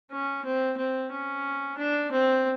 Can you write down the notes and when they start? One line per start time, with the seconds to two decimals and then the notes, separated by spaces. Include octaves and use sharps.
0.12 C#4
0.45 C4
0.78 C4
1.11 C#4
1.78 D4
2.12 C4